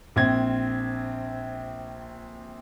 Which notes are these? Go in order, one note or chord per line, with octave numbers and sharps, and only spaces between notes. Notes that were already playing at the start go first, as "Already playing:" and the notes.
A#1 C4 G#6